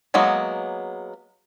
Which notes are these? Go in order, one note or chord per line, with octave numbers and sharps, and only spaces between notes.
F#3 G#3 A#3 B3